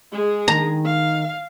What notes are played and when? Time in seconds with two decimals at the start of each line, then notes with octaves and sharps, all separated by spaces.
0.12 G#3 G#4
0.48 D#3 A#5
0.85 F5